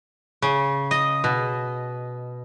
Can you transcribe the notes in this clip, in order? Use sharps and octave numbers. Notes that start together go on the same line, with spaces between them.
C#3
D#5
B2